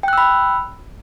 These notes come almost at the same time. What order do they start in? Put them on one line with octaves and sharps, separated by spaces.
G5 F#6 E6 B5